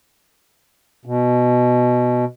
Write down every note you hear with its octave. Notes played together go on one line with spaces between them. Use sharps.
B2